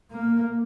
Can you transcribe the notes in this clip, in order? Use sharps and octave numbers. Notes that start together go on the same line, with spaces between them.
A#3